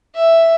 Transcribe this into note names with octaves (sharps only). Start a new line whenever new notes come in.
E5